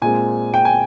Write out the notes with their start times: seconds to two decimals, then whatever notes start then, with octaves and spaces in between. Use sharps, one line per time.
0.02 A#2 G#3 C4 G#5
0.54 G5
0.65 G#5